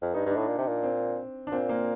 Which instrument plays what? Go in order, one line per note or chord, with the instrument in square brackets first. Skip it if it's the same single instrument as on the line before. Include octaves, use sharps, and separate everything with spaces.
[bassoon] F2
[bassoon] G2 [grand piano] D#4
[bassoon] G2
[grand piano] D4
[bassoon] A2
A#2
C3
A#2
[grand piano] C4
D4
[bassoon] A#2 [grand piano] C4
[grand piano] A#3